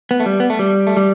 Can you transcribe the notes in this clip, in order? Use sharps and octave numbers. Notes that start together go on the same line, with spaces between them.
B3
A3
G3
B3
A3
G3
A3
G3